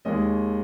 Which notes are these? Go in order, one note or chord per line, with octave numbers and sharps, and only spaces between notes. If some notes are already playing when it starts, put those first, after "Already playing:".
D#2 D#3 G#3 D#5